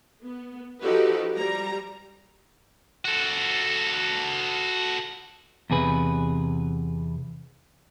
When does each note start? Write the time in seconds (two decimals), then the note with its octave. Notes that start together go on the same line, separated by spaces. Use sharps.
0.22 B3
0.82 F3 D#4 F#4 G4 A4 B4
1.35 G3 A#5
3.05 F#4 A4
5.70 E2 C3 G#4 B4